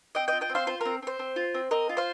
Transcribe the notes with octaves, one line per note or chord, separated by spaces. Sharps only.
C4 D#5 G5
D#5 G5
F4
D#5 G5
C4
C5 F5
F4 C5
C4 A#4
C4 C5
C4
F4
C4
C4 A#4 D#5
F4
C5 F5